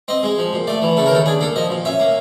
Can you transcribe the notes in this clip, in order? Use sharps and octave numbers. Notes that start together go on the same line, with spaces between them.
C4 D#5
G#3
F3
A#2
A3 D5
E3
C#3 A4
A#4
D#2 A4
D4 G#4
A#3 A4
F3 D#5
A#2
C#4 E5
A#3